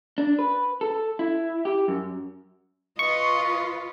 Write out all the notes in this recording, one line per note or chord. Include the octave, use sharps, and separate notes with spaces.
D4
B4
A4
E4
G4
F#2
F4 B4 D#5 C#6